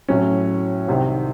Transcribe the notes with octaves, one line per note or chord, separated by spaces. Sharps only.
A2 F#3 C#4
C2 C3 D#3